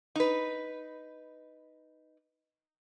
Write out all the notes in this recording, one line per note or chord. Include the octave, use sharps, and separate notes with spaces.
D#4 B4